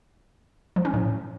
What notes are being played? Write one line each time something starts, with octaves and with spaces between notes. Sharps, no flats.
F3
C#4
A2